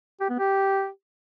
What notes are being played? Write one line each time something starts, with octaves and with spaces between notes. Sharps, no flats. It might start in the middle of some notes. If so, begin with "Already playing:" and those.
G4
B3
G4